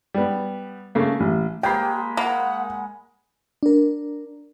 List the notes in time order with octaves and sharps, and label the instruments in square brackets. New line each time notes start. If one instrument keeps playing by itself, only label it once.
[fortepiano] G3 B3
C#3 A3 A#3
A1
[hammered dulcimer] G#3 A#3 B5 [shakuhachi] G4 [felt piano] G5 C7
[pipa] A#3 [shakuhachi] F#5 [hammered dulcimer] B5
[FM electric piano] D4 A#4